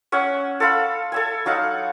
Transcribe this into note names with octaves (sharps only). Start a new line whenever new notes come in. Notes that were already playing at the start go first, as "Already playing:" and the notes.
C#4 E5 F#5
A4 C5 F5 B5
A4 E5 G#5
F#3 D#4 F5 F#5